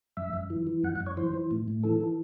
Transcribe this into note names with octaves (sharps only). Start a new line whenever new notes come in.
F#2 E5
F#2
E3
E3
F#2 F#5
F#5
F#2
C#5
E3 C5
E3
A2
A2
E3 A4
E3